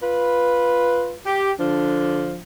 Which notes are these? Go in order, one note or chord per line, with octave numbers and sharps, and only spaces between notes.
F4 B4
G4
D3 F3 D4